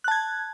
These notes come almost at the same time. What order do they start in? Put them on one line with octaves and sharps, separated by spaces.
F#6 A5 G#6